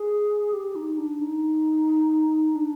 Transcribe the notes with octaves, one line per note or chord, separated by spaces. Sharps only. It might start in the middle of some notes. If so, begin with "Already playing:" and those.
Already playing: G#4
G4
D#4
D4
D#4
D4